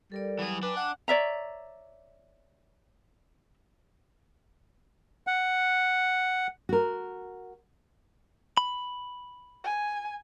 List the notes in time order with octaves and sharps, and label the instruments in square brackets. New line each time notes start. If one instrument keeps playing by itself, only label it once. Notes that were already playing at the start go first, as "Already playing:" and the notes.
[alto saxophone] G3 [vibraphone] A4 A#4 D5
[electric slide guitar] E3 G#4 [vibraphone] F#3
[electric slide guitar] D4 [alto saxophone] B4 [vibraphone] G5 G#5
[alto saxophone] F#5
[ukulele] C#5 D5 E5 A#5
[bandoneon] F#5
[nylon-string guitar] F#4 A#4
[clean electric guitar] B5
[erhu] G#5